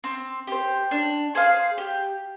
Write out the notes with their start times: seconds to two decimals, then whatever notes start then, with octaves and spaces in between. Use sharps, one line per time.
0.04 C4
0.47 G4 C5
0.91 D4
1.35 G#4 C5 F5
1.78 G4